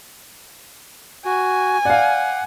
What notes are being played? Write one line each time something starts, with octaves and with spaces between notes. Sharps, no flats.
F#4 G#5
D5 F5 F#5